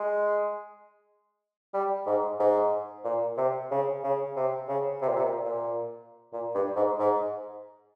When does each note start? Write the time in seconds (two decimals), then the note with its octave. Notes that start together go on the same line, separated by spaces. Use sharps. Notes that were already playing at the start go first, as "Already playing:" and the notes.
Already playing: G#3
1.74 G3
2.06 G#2
2.39 G#2
3.04 A#2
3.37 C3
3.71 C#3
4.04 C#3
4.36 C3
4.68 C#3
5.02 C3
5.08 A#2
5.16 C3
5.24 A#2
5.45 A#2
6.33 A#2
6.55 G2
6.76 G#2
6.99 G#2